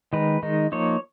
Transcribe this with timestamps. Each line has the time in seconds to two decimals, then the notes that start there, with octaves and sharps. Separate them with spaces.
0.13 D#3 G#3 D#4 B4
0.43 D#3 G#3 D#4
0.72 F3 A#3 D#4 C#5